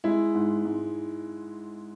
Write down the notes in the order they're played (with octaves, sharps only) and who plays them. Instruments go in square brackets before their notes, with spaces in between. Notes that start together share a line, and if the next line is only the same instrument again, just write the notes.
[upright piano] G#3 E4
G#2
G#2